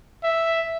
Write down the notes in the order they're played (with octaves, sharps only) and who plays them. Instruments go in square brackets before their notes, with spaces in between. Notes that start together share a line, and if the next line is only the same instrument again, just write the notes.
[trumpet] E5